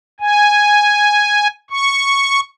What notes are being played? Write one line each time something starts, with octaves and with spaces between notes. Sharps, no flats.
G#5
C#6